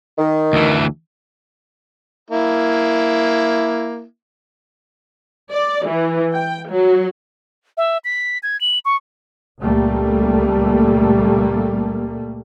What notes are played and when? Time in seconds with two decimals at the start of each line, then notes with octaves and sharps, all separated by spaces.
0.18 D#3
0.53 D2 E3
2.30 A#3 E4
5.52 D5
5.86 E3
6.34 G5
6.70 F#3
7.77 E5
8.04 B6
8.43 G#6
8.61 F#7
8.85 C#6
9.61 C#2 A#2 G3 A3 A#3